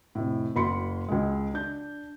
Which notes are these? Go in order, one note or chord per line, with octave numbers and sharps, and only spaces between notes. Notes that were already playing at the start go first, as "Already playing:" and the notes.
F1 A2
F#1 B5 C6 C#7
C#2 G#3
D4 G6